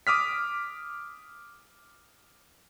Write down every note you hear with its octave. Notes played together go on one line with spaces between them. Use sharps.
D6 D#6 F6 B6